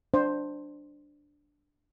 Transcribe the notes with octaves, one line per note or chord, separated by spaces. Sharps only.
D4 C5